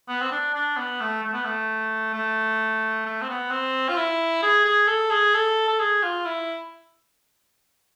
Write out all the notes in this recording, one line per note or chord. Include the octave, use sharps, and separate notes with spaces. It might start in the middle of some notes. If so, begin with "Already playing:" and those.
B3
C4
D4
D4
B3
A3
A3
B3
A3
A3
A3
C4
B3
C4
F4
E4
G#4
G#4
A4
G#4
A4
A4
G#4
F4
E4